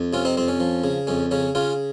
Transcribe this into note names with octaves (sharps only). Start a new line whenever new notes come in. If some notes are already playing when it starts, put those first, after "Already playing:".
Already playing: F2
C3 C#4 F4
C4 D#4
F2 C4
C#4
F3
C#3
F2 C#4
C#3 C#4
C#3 C#4 F4